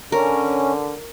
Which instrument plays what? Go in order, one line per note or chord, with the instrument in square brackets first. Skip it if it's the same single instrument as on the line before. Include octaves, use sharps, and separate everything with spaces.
[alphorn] D3 [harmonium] C#4 [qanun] A#4